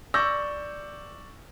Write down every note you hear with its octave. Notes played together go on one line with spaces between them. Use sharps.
D5 C#6 E6 G6 A#6